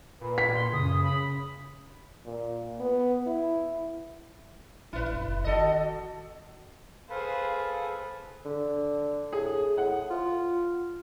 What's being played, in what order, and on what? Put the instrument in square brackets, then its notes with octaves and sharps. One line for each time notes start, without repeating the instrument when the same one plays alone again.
[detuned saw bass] A#2 [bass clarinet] B4
[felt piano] B6
[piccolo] C6
[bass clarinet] F#2 [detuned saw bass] C#3 [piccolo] D#6
[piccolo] B5
[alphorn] A#2
B3
E4
[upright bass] A#1 [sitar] E4 B4
[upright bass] F#1
[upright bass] D#3 [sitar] F#4 A4 D#5
[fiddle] G#4 C5 [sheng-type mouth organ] A4 B4 [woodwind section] F5
[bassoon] D3
[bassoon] A2 [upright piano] G#4
[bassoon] A2 [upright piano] F#5
[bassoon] F4